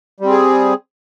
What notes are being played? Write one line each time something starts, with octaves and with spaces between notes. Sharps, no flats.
G3 C4 G#4